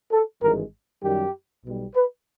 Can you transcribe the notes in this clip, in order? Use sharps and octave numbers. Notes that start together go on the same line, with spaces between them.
A4
G#1 G2 E3 G#3 A#4
F#2 D#3 G3 G4
B1 B2 G3
B4